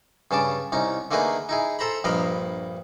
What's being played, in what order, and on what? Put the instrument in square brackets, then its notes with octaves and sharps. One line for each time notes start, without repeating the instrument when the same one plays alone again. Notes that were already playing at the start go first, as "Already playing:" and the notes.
[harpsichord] G2 C#3 C#4 A5 D6
C2 C#4 D#4
D3 A3 A#3 D#4 G#4 B4
D#4 E4 G#4
A4 C5 A#5 B5
A#1 G2 A#4 D#5 F5 B5